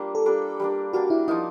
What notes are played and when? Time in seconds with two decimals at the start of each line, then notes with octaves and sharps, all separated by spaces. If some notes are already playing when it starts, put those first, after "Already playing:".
Already playing: G3 A#3 D4 F4 C5
0.15 A4
0.26 G3 A#3 D4
0.60 G3 A#3 D4
0.93 G3 A#3 D4 F#4
1.10 E4
1.28 F3 A#3 D#4 E4